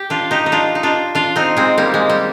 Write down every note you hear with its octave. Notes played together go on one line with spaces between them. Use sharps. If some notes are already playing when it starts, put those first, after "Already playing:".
Already playing: G4
D4 F4
D#4 G4
D#4
D4 F4
D#4
D4 F4
D4 F4
C4 D#4
G#3 C4
G3 A#3
G#3
G3